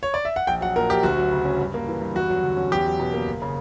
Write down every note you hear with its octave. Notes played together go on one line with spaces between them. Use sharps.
C#5
D5
E5
F#5
A#1 G5
F#3 F#5
A#2 A#4
A#1 G4
D2 F#4
F#3
C#3
C#4
G2
A#3
E3
G2
E2 F#4
F#3
D3
C#4
E2 G4
F#3
B2
A#3
F#1
C#3